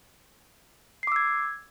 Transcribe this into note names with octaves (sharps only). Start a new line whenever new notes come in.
D6 E6 G#6 C7